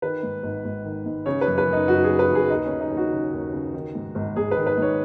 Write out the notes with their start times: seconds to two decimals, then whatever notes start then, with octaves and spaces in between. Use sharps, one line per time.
0.02 D#3 B4
0.23 G#2
0.43 G#1
0.64 G#1
0.84 D#3
1.06 G#2
1.26 C#3 C#5
1.41 B4
1.47 F#2
1.58 B4
1.67 F#1
1.73 D#4
1.88 F#1 F#4
2.04 G#4
2.09 C#3
2.19 B4
2.30 F#2
2.35 G#4
2.50 D#2 D#4
2.66 C#3 C#4
2.81 D#4
2.91 D#2
2.97 F#4
3.12 C#3
3.33 D#2
3.53 C#3
3.74 D#3
3.95 G#2
4.15 G#1
4.36 G#1 G#4
4.51 B4
4.57 D#3
4.67 B4
4.78 G#2 C#5